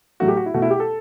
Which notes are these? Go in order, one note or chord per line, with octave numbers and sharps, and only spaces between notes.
A2 F#3 A3 F#4
G4
F#4
E4
B2 A3 F#4
E4
G4
A4